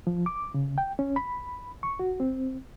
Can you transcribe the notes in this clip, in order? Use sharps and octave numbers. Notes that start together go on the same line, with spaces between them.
F3
D6
C#3
G5
C#4
B5
C#6
F#4
C4